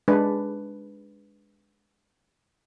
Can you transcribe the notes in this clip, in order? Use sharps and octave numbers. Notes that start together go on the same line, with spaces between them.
G#3 D4 B4